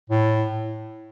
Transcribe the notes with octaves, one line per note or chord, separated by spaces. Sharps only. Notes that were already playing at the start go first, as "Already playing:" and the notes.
A2